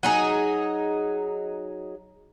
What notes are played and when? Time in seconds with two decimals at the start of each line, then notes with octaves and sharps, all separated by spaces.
0.03 F#3 D#4 G#4